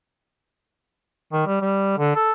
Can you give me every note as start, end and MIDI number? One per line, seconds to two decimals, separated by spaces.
1.33 1.43 51
1.47 1.59 55
1.62 1.94 55
1.98 2.13 50
2.15 2.33 69